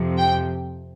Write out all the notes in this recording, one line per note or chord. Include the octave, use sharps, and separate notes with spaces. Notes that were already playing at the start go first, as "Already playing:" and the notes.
Already playing: F2 C3 F3
G5